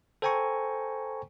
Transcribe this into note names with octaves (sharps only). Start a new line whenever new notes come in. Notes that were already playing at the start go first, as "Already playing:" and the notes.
A4 C5 G5 G#5 A#5 C#6